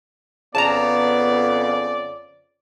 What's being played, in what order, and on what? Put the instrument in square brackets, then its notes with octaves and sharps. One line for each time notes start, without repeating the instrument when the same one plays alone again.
[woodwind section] F2 C#3 [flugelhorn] B3 [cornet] D5 [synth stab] A5 A#5